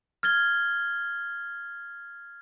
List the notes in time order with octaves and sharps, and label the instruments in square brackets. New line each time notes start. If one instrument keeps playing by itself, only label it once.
[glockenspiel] F6 G#6 A6 G7